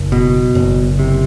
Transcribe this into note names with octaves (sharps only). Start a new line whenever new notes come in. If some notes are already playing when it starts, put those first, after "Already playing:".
Already playing: F#1
B2
F#1
C3